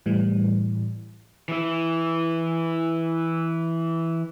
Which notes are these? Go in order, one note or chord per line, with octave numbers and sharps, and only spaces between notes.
A2 E3 G3
E3 E4